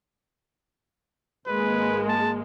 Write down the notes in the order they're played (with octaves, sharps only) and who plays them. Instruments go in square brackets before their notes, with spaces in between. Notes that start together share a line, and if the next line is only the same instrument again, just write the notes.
[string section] G#1 G#3 A#3 [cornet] B4
[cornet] A5